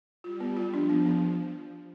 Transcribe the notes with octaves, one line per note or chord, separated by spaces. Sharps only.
G3 F4
B3
F4
F3 D4
B3
B3